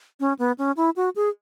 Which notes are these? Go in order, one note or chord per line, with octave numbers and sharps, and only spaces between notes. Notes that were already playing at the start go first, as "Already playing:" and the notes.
C#4
B3
C#4
E4
F#4
G#4